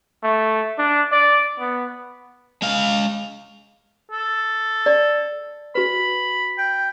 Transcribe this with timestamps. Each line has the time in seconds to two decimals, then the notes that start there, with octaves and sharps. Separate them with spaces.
0.23 A3
0.79 D4
1.12 D5
1.60 B3
2.62 G#3 F5
4.11 A4
4.86 D5
5.75 F#4 B4 B5
6.58 G5